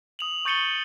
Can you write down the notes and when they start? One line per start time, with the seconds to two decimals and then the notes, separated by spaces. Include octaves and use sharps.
0.19 D#6 F7 F#7
0.45 C#6 G6 A6 C#7 D#7 G7